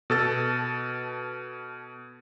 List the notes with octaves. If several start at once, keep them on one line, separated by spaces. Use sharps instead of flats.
B2 A4 A6